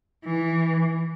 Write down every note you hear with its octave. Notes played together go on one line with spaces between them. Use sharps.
E3